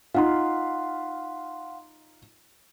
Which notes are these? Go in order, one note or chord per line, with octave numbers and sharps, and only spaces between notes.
D#4 F4 F5 F#5 C6